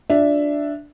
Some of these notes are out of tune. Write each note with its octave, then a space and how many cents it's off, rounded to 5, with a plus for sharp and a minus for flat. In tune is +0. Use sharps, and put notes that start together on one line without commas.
D4 +0 F4 +35 E5 +5